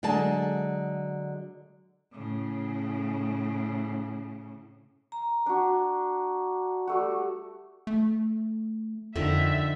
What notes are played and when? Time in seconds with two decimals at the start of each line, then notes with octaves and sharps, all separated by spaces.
0.03 D3 F#3 G#3 G#4 A5
2.13 A2 C#3
5.12 A#5
5.46 D4 F#4
6.87 G3 A3 F#4
7.87 A3
9.16 F2 D3 D#3 F3 E5